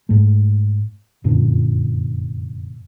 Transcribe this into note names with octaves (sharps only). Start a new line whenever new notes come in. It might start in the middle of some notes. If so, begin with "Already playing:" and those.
G#2 A3
F1 F#2 A#2 D3